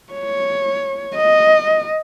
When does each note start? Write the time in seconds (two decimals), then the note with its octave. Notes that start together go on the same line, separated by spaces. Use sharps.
0.14 C#5
1.17 D#5